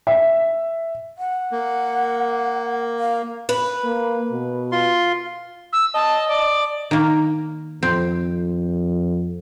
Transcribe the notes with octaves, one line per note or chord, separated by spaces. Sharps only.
E5
F#5
A#3
F5
B4
A#3
B2
F4 C6
E6
D#5 A5
D5
D#3 A#3
F2 C4